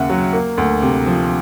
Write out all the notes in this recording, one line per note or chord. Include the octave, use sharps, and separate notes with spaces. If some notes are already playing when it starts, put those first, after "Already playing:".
Already playing: D#2 C#3 A#3 E5 F#5
F#3
A#3
D2
C3
F3